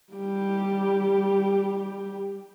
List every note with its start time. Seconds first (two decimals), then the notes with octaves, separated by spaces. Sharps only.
0.13 G3 G4